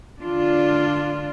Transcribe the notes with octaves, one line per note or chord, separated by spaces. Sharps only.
D3 D4 F4